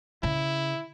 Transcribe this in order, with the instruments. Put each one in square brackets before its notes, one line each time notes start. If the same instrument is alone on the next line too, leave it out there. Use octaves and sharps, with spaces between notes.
[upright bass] C#3 [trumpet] E4